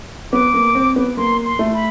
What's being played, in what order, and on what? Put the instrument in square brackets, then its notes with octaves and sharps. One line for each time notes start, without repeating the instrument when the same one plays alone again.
[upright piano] B3 [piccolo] D6
[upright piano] A#3
C4
B3
[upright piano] A#3 [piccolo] C6
[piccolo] C6
[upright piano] A3
[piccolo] B5